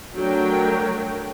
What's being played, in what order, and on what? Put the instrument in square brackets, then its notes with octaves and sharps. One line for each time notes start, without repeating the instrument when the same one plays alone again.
[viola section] F#3 A3 D4 A#4 C#5 G5